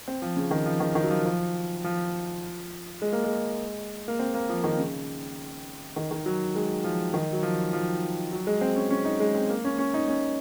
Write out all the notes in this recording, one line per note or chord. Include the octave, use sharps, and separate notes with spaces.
C4
F3
C#3
D#3
F3
D#3
D#3
F#3
F3
F3
F3
G#3
A#3
G#3
A#3
C4
A#3
F3
D#3
C#3
D#3
D#3
F#3
G#3
F3
D#3
F#3
F3
F3
F#3
G#3
C4
C#4
C#4
D#4
G#3
C4
A#3
C#4
C#4
D#4
C#4